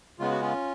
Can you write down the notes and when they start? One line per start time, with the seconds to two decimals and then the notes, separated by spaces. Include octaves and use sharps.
0.19 C#3 G#3 B3 F4
0.30 F#4
0.41 C#4 F4